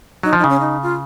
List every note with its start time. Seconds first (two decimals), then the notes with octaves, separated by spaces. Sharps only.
0.23 F#3 D#4
0.33 F3
0.39 D#4
0.44 C#3
0.49 C#4
0.60 D#4
0.83 F4